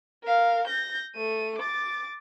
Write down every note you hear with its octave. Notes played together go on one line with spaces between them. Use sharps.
A#4 F5
G6 A#6
A3 D#7
D6 A6